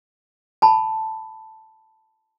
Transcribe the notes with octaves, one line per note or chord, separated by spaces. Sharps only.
A5 B5